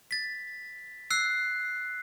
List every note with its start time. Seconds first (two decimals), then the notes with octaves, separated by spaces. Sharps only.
0.11 A6 B6
1.11 E6 F#6 C7